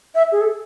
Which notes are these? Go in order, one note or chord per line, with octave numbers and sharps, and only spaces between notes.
E5
G#4
A4